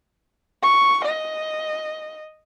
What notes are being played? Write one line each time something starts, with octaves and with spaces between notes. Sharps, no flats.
C#6
D#5